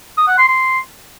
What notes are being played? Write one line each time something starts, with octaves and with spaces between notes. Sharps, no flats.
D#6
F#5
C6
C6